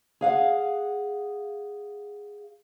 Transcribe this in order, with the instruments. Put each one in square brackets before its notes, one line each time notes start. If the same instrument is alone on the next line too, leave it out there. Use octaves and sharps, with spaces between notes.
[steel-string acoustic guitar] G#4 F5 F#5